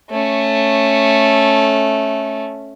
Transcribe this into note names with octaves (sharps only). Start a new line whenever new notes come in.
A3 C#4